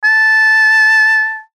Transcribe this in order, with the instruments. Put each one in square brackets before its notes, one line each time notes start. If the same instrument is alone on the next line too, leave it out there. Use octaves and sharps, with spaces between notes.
[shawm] A5